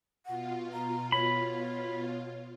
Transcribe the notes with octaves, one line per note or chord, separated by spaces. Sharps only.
B2 F4 F#5
A#5
C#5 B5